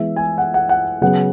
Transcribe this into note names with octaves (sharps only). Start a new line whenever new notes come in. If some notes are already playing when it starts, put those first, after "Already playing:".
Already playing: E3 G#3 B3 E5
G#5
F#5
F#5
F#5
C#3 F#3 B3 F#5